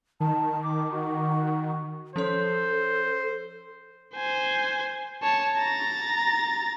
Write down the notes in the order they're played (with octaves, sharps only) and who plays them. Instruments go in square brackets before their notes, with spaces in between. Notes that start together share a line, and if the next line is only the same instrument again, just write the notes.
[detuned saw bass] D#3 [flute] A5
[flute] D6
F#4
[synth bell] F3 C#4 C#5 [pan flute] A4 [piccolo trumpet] C5
[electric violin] C5 G#5
C#5 A5
A#5 A6